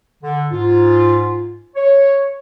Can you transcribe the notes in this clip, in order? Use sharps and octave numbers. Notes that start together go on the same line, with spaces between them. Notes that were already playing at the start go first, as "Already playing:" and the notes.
D3
G#2 F4
C#5